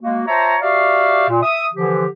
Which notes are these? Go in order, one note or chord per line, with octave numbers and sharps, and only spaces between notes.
G#3 A#3 F#4
F4 C5 C#5 E5 A5 A#5
F#4 G4 D5 E5 F5
A#2
E5 D#6
D3 E3 F3 G4